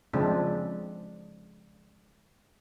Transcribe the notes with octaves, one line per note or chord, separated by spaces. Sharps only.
C#3 F3 G#3 C4 D4